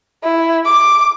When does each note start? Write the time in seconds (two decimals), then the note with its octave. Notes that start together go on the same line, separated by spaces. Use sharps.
0.24 E4
0.66 D6